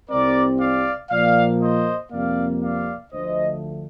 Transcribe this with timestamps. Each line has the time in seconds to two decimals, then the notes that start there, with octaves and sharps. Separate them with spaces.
0.10 C2 C3 G3 C4 A#4 D5
0.60 D5 F5
1.11 A#2 F3 A#3 D5 F5
1.60 C5 D#5
2.11 F2 C3 G3 A#3 D5 F5
2.61 D5 F5
3.12 D2 D3 F3 A3 C5 D#5